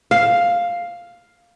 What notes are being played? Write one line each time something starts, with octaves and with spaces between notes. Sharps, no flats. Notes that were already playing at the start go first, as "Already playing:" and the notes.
F5